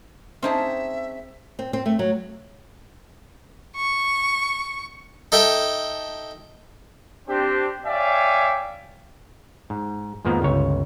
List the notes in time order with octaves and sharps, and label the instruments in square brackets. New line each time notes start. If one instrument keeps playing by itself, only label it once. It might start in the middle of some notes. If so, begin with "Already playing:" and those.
[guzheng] C4 D#4 G#4 [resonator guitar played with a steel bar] C#4 C5 A5 [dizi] E5
[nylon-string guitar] C4
C4
A3
F#3
[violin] C#6
[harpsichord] D#4 A4 E5 G5
[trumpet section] C4 D4 G4
C#5 D5 E5 F5 G5 G#5
[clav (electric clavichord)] G#2
F2 G#2 D#3 F3 A#3 B3
G1 C#2 C#5